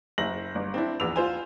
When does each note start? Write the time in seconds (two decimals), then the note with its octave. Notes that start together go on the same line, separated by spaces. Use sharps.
0.18 F#1 E5 A#6 F#7
0.55 G1
0.74 C4 D4 E4
1.00 A#1 E2 B4 E6 F7
1.16 F4 C5 G#5